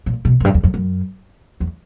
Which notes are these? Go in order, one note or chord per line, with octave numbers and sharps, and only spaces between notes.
A#2
B2
F#2
G2
E2
F2
F#2
E2